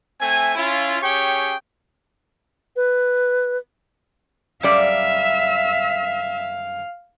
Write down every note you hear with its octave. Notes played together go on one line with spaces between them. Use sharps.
A3 C4 E5 G#5
C#4 E4 F4
C#4 G4 G#4 C#5 G5 C#6
B4
F#2 G3 D5 E5 F5